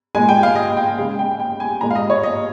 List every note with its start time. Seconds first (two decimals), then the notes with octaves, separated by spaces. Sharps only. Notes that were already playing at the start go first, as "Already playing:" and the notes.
0.15 A#2 G#3 G#5
0.29 G5
0.43 F5
0.56 D#5
0.77 G5
0.98 C#3 G#3 F5
1.19 G5
1.40 G5
1.60 G#5
1.81 A#2 G#3 A#5
1.91 F5
1.95 D#5
2.10 C#5
2.23 D#5